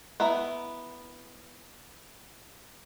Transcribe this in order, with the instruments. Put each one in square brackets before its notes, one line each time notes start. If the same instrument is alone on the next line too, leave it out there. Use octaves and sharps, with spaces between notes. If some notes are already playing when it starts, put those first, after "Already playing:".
[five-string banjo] B3 E4 E5 A#5